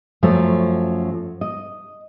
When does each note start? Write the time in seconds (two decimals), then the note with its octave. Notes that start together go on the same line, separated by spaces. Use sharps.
0.23 F#2 F3 F#3 A3
1.41 D#5